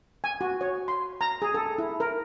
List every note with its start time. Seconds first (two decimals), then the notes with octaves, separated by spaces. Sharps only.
0.24 G#5
0.41 F#4
0.61 C#5
0.88 C6
1.21 A#5
1.42 G#4
1.54 A4
1.78 E4
2.00 A#4